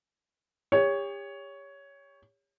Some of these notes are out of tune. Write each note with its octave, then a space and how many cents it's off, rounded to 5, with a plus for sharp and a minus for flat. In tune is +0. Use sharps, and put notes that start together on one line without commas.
G4 +40 C#5 +10